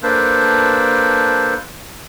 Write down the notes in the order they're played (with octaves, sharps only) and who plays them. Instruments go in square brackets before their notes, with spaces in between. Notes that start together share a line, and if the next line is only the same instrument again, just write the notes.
[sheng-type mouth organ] A#3 D4 A4 B4 C5